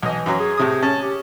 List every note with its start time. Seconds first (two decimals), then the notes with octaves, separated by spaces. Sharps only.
0.03 B1 E3 D#5
0.26 F#2 F#3
0.39 G#4
0.58 A2 C3 D#6
0.83 C#4 A5
1.02 G4